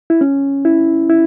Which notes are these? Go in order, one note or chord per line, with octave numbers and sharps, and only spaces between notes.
E4
C#4
E4
E4